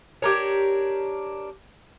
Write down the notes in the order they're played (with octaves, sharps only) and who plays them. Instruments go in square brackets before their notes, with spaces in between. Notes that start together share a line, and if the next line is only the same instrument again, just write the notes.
[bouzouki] D4 G4 A#4 C#5